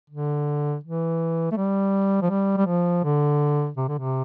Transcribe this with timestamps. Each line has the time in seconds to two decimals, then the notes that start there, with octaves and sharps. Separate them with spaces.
0.10 D3
0.83 E3
1.52 A3
1.57 G3
2.22 F3
2.30 G3
2.57 G3
2.66 F3
3.04 D3
3.77 C3
3.88 D3
3.99 C3